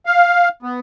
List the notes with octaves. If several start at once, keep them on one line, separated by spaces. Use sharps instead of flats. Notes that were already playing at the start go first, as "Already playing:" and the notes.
F5
B3